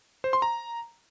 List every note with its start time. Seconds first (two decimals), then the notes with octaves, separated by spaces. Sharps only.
0.24 C5
0.33 C6
0.42 A#5